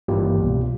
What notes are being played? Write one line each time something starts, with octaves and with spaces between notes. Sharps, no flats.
G#1 G2 E3 G3 A#3 F4 G4
C2 B2 G3